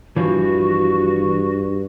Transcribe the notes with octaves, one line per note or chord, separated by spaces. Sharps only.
G2 E3 F3 F#4